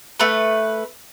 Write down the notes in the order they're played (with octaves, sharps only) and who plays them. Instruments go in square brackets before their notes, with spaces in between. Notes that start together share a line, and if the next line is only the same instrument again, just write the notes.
[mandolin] A3 B4